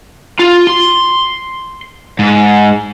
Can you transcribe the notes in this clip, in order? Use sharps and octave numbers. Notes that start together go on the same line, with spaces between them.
F4
C6
G#2